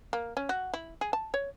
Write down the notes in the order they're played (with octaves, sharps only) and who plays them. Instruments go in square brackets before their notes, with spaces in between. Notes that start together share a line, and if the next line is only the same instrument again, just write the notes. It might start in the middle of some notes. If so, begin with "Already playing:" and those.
[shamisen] A#3
C#4
F#4
E4
G#4
A5
C#5